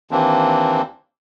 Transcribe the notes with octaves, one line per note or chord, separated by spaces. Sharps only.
D#2 E3 A#3 C4 D4